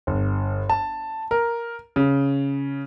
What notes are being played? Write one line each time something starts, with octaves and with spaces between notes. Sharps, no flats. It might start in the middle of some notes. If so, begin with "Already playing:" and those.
G1
A5
A#4
C#3